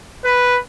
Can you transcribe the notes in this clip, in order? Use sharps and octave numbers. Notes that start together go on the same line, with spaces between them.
B4